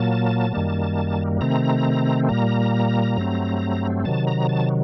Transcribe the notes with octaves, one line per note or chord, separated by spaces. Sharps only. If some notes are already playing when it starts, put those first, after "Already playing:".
Already playing: A#2 F#3 A#3 A5
F#2 D#3 G3 A#3
C3 D#3 A3 C4 A#5
A#2 G3 A#3 A#5
G2 F#3 A3 C4
C3 D#3 F#3 A5
A#5
A5